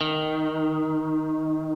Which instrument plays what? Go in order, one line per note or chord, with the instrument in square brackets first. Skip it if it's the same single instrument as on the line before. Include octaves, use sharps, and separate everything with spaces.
[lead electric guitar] D#3